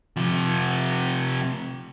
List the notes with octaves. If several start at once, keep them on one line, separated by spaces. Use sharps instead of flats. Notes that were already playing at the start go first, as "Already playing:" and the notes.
C3 F3